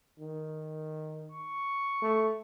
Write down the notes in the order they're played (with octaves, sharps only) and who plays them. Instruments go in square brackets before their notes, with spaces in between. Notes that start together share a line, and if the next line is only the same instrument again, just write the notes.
[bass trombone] D#3
[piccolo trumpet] C#6
[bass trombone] A3